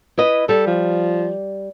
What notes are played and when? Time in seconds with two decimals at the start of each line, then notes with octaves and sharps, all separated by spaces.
0.18 E4 B4 D#5
0.49 G3 A4
0.67 F3